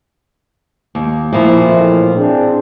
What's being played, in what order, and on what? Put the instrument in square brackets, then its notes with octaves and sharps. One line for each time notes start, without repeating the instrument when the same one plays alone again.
[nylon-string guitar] D#2
[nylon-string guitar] A#2 F3 [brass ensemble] E4
[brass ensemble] F2 A2 E3
C4 D4 G#4